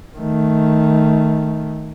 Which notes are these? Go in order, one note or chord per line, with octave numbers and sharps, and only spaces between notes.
D#3 A3